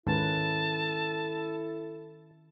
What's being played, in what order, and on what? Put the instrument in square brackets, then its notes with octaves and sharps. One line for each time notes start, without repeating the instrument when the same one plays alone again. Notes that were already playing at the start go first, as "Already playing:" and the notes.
[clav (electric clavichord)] G#2 [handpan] D#3 C#4 B4 [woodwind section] E4 A4 [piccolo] A5